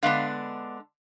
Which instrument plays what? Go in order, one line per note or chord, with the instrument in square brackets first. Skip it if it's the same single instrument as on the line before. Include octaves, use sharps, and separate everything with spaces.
[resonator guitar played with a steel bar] D3 G#3 B3 D4 F5